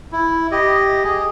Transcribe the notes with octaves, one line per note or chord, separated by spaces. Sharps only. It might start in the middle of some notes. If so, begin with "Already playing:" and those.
E4
G4 D#5
G#4